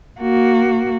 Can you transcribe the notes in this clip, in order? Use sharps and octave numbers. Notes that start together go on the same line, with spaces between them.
A#3 F#4